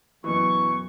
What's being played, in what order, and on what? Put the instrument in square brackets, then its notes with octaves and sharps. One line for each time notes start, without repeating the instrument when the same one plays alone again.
[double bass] F#2 [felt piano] B2 E3 [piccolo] C#6